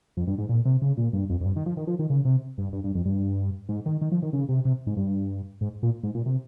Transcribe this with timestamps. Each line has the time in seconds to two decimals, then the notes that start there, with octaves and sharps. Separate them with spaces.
0.17 F2
0.27 G2
0.38 G#2
0.49 A#2
0.65 C3
0.82 C#3
0.97 A#2
1.13 G2
1.30 F2
1.41 F2
1.45 G2
1.56 D#3
1.66 F3
1.77 D#3
1.87 F3
1.99 D#3
2.10 C#3
2.25 C3
2.58 G2
2.73 G2
2.84 G2
2.95 F2
3.05 G2
3.69 G#2
3.86 D#3
4.02 D#3
4.12 F3
4.22 D#3
4.33 C#3
4.49 C3
4.65 C3
4.87 G#2
4.97 G2
5.61 G#2
5.83 A#2
6.03 G#2
6.15 A#2
6.26 C3